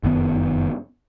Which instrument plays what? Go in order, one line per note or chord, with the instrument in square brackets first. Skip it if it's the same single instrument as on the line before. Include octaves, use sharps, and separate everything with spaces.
[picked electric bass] F1 F#2 D#3 B3